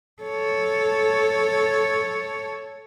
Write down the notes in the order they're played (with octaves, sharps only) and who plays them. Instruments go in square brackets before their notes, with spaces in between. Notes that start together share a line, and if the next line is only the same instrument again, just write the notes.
[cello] A4 C#5